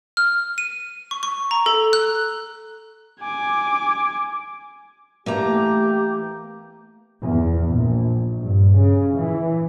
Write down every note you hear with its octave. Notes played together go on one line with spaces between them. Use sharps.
F6
D#7
C#6
C#6
A#5
A4
F#6
G#5 D6
E3 A3 A#3 E4 G4 A#5
E2
A#1
G2
C#3
E3